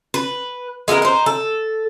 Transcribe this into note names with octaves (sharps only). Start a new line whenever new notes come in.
B4
G#3 B3 E4 A#4
D#4 C5
A4